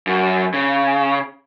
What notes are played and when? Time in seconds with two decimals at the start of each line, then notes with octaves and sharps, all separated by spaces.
0.07 F#2
0.54 C#3